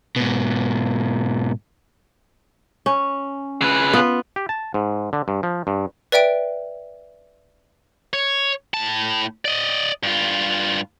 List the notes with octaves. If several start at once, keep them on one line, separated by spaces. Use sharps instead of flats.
G#2 B2
C#4
C#3 B4
B3 F4
G4
A5
G#2
D3
G2
F3
G2
B4 D5 E5 G5 D7
C#5
A2 A5
D5 D#5
G2 F4